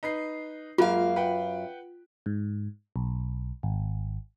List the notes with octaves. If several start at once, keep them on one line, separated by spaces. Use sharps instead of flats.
D#4 B4 C7
F#2 G#3 A#3 F4 F5
B4 F#5 G5
G#2
B1
G#1